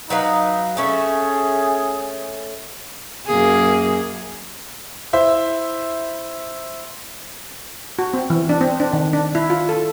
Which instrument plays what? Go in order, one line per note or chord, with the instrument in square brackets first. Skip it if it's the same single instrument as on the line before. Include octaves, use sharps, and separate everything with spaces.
[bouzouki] F#3 B4 F5 [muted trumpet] D#4
[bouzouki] A3 C#4 E5 [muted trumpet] G#4
[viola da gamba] F#2 A#3 G#4
[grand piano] E4 C5 E5
[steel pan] F#4
C4
E3
D4
C4
D4
D#3
D4
E4
F4
A4